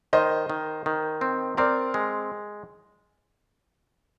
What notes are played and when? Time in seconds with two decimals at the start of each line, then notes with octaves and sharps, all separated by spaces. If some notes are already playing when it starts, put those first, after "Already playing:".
0.13 D#3 C5 D#5
0.50 D#3
0.86 D#3
1.21 C4
1.57 C4 A#4 D5
1.94 G#3